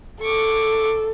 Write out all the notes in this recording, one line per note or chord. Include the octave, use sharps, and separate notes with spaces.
A4 C#6 D6